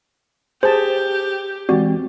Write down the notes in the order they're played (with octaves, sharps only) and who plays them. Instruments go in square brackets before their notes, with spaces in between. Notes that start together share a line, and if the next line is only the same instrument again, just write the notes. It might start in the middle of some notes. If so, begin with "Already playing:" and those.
[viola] G4 [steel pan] G#4 A5 [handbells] C5
[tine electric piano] E3 G#3 C4 [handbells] F#4 [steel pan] G4 D5